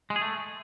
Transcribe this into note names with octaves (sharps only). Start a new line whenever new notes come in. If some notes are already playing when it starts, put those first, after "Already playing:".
G#3
G#4
A3